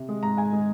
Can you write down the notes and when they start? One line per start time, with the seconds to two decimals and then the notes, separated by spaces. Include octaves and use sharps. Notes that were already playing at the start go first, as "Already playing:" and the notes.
Already playing: C3
0.09 G#3
0.23 G#2 A#5
0.37 G#2 G#5
0.53 G#3